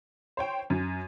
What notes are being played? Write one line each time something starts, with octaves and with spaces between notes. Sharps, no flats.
C5 C#5 G5
F#2